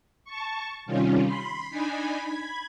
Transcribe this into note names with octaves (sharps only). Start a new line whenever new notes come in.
A5 C#6
C3 D#3 G3 C#4 F4
B5 C6
D4 D#4 G#5 B5
B5 G#6